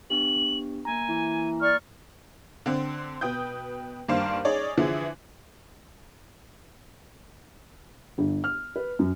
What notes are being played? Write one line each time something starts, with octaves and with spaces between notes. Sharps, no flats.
B3 D4 G4 F#7
A#3 G#5 A#5
E3
D5 C#6 F6
D3 C4
B2 B4 G5 D#6 G6
G2 D#3 A#3 D4 C5 F5
C#4 D#4 G#4 C#5 D5
D3 E3 F3 E4 G#4
G1
F6
B4
F#2